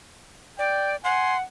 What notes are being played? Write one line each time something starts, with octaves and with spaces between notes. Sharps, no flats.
D5 G5
F#5 G#5 C6